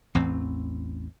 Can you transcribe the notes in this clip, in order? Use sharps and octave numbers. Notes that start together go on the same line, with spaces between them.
A1 E2 A2 C4